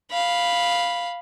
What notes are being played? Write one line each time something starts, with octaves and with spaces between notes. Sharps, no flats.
F5 B5